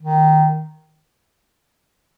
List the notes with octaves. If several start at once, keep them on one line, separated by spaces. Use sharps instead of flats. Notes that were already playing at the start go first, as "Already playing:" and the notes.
D#3